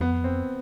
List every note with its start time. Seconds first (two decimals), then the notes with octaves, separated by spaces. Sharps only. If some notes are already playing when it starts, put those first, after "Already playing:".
0.01 F2 B3
0.24 C4